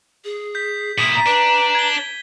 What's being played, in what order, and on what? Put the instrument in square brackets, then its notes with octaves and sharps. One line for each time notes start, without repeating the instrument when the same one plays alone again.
[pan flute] G#4
[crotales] G6 B6
[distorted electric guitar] A#2 E4 [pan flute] D#6 [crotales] B6 D#7
[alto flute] A#5
[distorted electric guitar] D4 [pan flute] B4
[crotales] G#6 G7